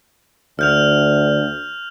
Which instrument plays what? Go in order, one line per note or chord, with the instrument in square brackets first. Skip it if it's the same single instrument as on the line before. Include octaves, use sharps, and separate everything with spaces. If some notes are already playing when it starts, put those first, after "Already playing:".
[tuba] D2 [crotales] F6 G6 F7